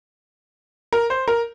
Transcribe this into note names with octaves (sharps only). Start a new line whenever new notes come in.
A#4
C5
A#4